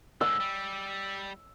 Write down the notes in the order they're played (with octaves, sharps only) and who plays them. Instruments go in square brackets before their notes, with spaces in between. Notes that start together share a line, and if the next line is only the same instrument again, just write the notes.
[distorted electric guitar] G#2 D3 [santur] E6
[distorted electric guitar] G3